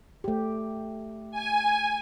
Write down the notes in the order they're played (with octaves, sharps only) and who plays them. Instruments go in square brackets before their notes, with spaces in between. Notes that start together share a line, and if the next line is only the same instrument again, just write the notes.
[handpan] A3 G4
[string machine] G#5